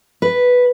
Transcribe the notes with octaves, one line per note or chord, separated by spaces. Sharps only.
B4